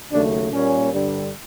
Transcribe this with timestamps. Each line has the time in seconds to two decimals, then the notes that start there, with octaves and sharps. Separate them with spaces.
0.11 D#2 C#3 F#3 A3 D4
0.51 A#2 G3 A#3 C#4
0.91 G2 D3 G3